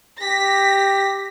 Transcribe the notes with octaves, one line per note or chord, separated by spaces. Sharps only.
G4 A#6 B6